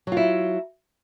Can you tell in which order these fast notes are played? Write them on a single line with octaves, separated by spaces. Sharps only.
F#3 F4 E4